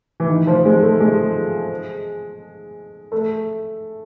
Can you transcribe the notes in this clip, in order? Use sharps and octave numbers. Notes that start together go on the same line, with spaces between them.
E3
D#3
F3
G#3
A3
G#3
A3